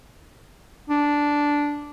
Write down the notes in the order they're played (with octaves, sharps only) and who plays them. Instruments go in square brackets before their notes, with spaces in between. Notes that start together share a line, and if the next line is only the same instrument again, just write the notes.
[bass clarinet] D4